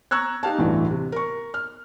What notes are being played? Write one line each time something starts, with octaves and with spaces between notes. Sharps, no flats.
A#5 C#6 E6 F#6 G#6
D#4 G4 F5 A5
A1 D2 G2 D3 E3
C3
A#4 C#6
F6